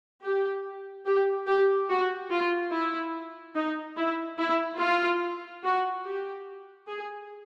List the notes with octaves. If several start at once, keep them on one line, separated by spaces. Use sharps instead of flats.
G4
G4
G4
F#4
F4
E4
D#4
E4
E4
F4
F#4
G4
G#4